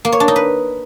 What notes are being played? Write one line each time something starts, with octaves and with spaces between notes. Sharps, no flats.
A#3
C#5
D4
D#4
B4